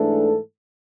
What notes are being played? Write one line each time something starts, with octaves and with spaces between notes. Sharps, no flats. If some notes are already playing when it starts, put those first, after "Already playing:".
Already playing: G#2 E3 A3 D4 A4